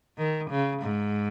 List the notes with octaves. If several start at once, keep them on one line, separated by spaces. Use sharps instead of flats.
D#3
C#3
G#2